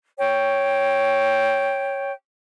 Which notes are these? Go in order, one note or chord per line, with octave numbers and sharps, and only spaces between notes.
C#5 G5